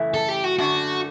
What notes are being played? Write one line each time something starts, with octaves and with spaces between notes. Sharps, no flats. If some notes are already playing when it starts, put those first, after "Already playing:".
Already playing: F#2 C#3 E3 A3 E4
A4
G4
F#4
F#2 D3 A3 D4 F#4